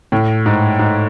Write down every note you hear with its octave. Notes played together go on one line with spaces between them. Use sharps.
A2
G#2
G#2